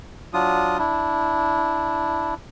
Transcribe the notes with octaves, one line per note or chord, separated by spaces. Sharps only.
F#3 D4 F4 D#6
D4 E4